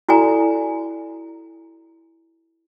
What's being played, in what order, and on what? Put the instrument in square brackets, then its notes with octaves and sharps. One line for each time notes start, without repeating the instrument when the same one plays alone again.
[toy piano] E4 F#4 A4 D5 G#5 A#5